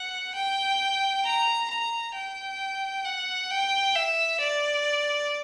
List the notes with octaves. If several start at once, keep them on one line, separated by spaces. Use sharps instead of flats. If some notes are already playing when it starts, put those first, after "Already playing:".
Already playing: F#5
G5
A#5
A#5
G5
F#5
G5
E5
D5